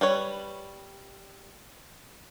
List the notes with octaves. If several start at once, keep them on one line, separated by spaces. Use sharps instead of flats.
G3 B4 C#5